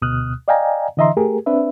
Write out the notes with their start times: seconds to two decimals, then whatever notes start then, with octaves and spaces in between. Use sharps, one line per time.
0.02 D2 B2 D#6 F6 F#6
0.48 D5 D#5 F5 G5 G#5 A#5
0.97 D3 E3 D#5 E5 A#5 C6
1.17 A3 G4 G#4 A#4
1.46 C4 D4 B4 E5